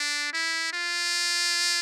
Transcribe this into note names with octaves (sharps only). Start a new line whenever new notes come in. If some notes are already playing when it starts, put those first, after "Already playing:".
Already playing: D4
E4
F4